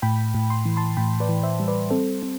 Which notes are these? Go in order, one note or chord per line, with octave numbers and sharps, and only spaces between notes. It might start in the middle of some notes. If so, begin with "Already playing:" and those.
A2 G5 B5
A2
C6
E3
A5 C6
A2 G5 B5
B4 D5
E3
C5 E5
G3
B4 D5
C4 A4 C5
C4